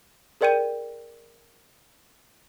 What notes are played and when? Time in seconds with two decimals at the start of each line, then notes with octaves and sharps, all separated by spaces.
0.41 G#4 A#4 D5 G5 G6 D#7